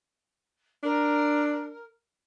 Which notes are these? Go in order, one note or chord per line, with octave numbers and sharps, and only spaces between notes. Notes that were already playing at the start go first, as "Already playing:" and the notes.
D4 A#4